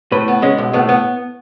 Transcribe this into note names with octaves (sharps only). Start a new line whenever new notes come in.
A2 B4
B3
G#3 C#4
B1
A2 B3
B3